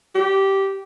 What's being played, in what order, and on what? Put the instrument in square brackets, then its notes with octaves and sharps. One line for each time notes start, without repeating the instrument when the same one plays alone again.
[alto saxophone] G4